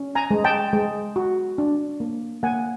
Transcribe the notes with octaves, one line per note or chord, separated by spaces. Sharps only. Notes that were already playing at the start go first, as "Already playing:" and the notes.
Already playing: C#4
G#5 A#5
G#3
G5 A5
G#3
F#4
D4
A#3
A#3 F#5 G#5